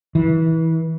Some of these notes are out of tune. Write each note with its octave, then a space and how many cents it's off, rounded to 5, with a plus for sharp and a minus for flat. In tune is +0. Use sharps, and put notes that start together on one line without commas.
E3 -25